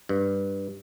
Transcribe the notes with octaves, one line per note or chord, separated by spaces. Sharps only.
G2